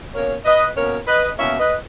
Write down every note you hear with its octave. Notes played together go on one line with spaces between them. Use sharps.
B2 A#3 C#4 A#4 C#5
B4 D#5
B2 A#3 C#4 A#4 C#5
B4 D#5
B2 A#3 C#4 C#5 E5
B4 D#5